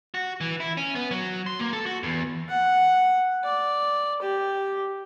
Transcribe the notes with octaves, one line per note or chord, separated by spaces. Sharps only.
F#4
E3
E4
C#4
B3
F#3
C6
A#3
A4
F#4
E2
F#5
D5
G4